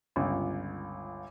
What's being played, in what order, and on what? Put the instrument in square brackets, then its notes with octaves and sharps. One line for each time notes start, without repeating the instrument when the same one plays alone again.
[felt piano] G1 C#2